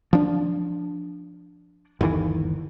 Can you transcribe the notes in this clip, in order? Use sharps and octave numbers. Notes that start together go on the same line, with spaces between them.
F3 D4
G1 D#2 D#3 E3